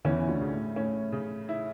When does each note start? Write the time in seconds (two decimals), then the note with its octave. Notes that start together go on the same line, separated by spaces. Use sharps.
0.04 E2 E3 C#4
0.28 D2 D3
0.41 C#3
0.53 A2
0.76 A2 C#4
1.12 C#3
1.49 E4